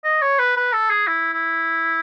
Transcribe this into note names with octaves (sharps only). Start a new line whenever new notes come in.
D#5
C#5
B4
B4
A4
G#4
E4
E4